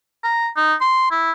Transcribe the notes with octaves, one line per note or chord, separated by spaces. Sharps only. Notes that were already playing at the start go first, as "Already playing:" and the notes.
A#5
D#4
C6
E4